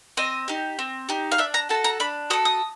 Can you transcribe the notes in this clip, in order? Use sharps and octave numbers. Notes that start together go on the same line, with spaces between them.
C4 D#5
D#4 G4
C4
D#4 G4
F5
D4 E5
A#5
F#4 A4 A5
A#5
D4 B5
F#4 A4 D#6
D#6